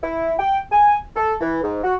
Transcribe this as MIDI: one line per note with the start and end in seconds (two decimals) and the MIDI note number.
0.02 0.33 64
0.38 0.58 79
0.71 0.97 80
1.15 1.34 69
1.40 1.58 52
1.62 1.82 44
1.82 1.94 66